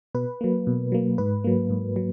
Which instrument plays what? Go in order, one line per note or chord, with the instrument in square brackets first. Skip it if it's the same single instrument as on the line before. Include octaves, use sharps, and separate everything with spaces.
[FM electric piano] B2 B4
F#3 A#3
B2
F#3 A#3
G#2 B4
F#3 A#3
G#2
F#3